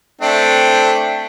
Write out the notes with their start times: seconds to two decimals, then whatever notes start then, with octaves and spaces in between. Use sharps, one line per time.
0.21 A3 C4 D4